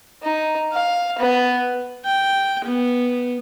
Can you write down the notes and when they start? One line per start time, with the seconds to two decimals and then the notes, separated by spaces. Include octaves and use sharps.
0.23 D#4
0.73 F5
1.19 B3
2.05 G5
2.64 B3